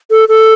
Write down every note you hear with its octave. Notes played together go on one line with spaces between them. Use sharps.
A4
A4